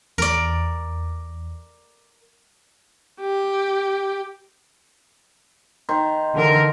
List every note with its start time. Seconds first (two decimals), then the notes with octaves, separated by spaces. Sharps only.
0.18 E2 A#4 D5
3.21 G4
5.89 D#3 C5
6.34 D3 E3 A#4